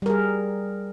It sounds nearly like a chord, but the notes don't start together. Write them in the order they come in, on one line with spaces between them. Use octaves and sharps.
G3 A#4 G#4